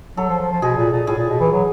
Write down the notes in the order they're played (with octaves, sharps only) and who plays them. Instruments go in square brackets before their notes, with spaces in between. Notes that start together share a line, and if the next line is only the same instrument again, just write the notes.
[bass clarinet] F#3 [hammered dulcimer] A4
[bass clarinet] F3
F3
F3
[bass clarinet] B2 [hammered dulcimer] G#4
[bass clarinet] A#2
A#2
[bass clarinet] A2 [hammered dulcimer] G#4
[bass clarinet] A#2
B2
E3
F#3